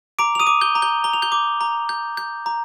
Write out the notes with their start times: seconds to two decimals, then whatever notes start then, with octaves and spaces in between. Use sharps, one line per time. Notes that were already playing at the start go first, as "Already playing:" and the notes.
0.19 A#5 D6 D7
0.35 F7
0.40 D#6 D#7
0.47 D6
0.61 G6 G7
0.75 A#5
0.82 G6 G7
1.04 A#5 G7
1.13 F7
1.22 G6 G7
1.32 D6
1.61 A#5
1.89 G6
2.17 G6
2.46 A#5